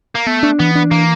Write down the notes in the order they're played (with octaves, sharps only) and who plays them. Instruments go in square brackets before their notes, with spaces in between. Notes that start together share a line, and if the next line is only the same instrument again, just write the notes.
[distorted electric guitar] A#3
[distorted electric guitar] A3 [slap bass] B3
[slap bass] D4
[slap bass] E3 [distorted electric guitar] B3
[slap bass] D4
[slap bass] E3 [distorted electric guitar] A#3